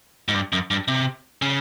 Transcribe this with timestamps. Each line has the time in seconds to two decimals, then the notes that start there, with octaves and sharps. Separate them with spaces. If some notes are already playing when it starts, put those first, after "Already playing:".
0.29 G#2
0.34 G2
0.53 F#2
0.71 G2
0.88 C3
1.42 C#3